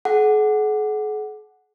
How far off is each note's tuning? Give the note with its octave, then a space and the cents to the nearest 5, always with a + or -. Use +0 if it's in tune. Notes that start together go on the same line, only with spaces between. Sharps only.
G#4 +45 F#5 +0